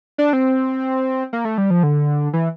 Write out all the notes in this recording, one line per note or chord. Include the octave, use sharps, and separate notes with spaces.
D4
C4
A#3
A3
G3
F3
D3
E3